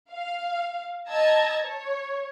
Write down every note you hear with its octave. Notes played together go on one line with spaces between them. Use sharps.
F5
D#5 A5 A#5 E6 G#6 A#6
C#5